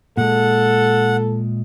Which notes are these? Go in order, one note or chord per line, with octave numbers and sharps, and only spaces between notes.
A#2 G#3 A4 F#5